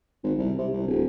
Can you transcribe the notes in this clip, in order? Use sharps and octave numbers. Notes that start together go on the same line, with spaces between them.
G#1
C2
C3
C2
D1